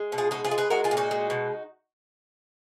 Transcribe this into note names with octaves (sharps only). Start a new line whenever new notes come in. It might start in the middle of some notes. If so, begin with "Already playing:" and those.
Already playing: G#3
B2
F4 G#4
G#3 D#4 F#4
F4 G#4
G#3
G#4 B4
G#3 F#4 A#4
F4 G#4
A#2
D#4 F#4
G#3
B2